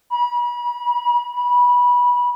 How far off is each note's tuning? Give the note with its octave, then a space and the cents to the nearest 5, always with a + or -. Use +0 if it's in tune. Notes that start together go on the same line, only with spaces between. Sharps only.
B5 -35
B5 -20